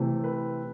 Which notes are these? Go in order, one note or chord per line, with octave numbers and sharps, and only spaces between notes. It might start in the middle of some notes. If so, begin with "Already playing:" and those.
Already playing: C3 E3 A3 C4
B4